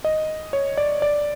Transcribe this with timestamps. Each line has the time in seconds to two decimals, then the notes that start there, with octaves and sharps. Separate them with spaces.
0.05 D#5
0.53 C#5
0.78 D5
1.02 D5